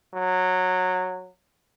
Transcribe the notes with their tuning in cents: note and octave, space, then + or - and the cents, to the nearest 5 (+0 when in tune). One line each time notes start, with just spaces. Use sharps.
F#3 -10